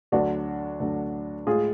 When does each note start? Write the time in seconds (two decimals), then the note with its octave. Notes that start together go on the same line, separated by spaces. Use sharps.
0.12 D2 D3 F#3 D4 F#4
0.80 D2 D3 F#3
1.46 A2 G#3 F4 G#4